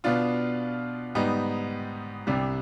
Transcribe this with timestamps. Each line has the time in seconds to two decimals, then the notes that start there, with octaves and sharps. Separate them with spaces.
0.04 B2 B3 D4 F4
1.15 G#2 G3 B3 D#4
2.27 C2 C3 G3 D4